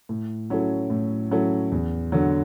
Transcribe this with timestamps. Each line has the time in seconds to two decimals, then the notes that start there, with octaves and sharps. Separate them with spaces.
0.09 A2
0.50 F#3 C#4 E4 A4
0.90 A2
1.31 F#3 C#4 E4 A4
1.72 E2
2.12 D3 F#3